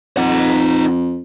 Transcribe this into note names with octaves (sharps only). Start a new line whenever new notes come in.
F2 D#4 F#5